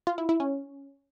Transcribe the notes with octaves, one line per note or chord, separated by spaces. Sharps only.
F4
E4
E4
C#4